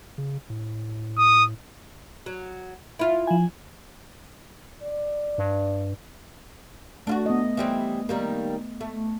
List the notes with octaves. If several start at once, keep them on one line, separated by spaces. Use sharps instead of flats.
C#3
A2
D#6
F#3
E4 F4
F3 G#5
D5
G2
A3 D4 F4 F#4
B3 D#5
E3 G3 C4
D#3 G3 A#3
A3